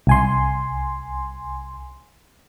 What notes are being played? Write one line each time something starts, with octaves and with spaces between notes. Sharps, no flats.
C2 G#5 C6